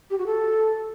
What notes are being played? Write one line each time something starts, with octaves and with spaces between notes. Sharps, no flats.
G4
F#4
A4